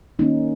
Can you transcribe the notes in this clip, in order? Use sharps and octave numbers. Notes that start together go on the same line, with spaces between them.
D#3 A#3 C#4 D#4